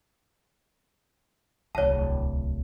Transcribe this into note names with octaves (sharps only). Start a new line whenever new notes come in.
D1 C2 C#5 A5